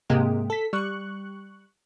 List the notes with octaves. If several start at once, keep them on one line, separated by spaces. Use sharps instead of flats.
G#2 C3 G#3 A#3 G4
A4 B6
G3 C#6 F#6